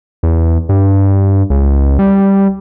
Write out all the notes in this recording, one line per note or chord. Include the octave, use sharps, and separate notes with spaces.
E2
G2
C#2
G3